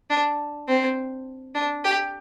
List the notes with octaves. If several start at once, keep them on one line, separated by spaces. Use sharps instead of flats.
D4
C4
D4
G4